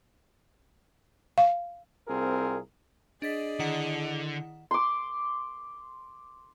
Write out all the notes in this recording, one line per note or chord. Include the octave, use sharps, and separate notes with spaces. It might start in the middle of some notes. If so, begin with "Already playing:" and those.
F5
C2 C4 F4 G#4 A#4
D4 G#4 D5 D#5 A6 B6
D3 D#3 E4 F#5
C6 D6